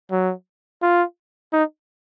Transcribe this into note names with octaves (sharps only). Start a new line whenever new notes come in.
F#3
F4
D#4